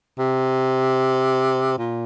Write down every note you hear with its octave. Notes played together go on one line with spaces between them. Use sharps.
C3
A#2